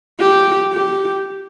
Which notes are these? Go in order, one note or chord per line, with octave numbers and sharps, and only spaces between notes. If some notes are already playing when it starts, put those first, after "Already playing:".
G4
G4